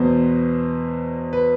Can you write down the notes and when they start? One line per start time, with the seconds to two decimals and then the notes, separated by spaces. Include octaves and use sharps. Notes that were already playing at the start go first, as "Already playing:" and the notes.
Already playing: E2 B2 B3 C5
1.33 B4